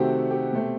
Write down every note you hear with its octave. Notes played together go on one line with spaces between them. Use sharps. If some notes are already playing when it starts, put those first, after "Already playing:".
Already playing: C3 D#3 A3 C4 F#4 G4
G4
B2 A3 C4